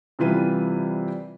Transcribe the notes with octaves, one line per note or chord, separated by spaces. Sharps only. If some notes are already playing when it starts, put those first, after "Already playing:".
C3 E3 G3 F4 B4 D#7